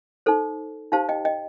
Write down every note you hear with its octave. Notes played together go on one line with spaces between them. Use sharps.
D#4 A4 C5
D#4 G4 C5 F5 A5
D#5 G5
D#5 G5